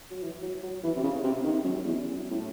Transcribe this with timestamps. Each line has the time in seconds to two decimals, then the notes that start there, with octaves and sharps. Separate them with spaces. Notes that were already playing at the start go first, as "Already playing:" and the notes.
0.11 F#3
0.23 E3
0.42 F#3
0.63 F#3
0.83 E3
0.96 C3
1.03 C#3
1.23 C3
1.44 D#3
1.64 F#2
1.85 E2
2.12 F#2
2.31 A2